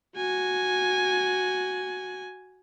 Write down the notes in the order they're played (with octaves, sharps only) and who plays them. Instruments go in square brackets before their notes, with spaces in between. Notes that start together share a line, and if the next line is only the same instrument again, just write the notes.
[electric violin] F#4 G#5